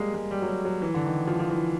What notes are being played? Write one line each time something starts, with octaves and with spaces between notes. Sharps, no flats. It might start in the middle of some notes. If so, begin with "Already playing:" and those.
Already playing: G3 G#3 A#3
G#3
G3
F#3
G3
F#3
E3
D3
D#3
F3
F3
E3